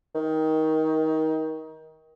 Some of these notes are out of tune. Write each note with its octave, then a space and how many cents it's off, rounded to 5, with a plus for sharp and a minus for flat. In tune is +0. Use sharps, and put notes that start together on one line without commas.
D#3 +20